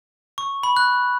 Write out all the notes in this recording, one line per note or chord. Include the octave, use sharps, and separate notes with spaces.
C#6
B5
F#6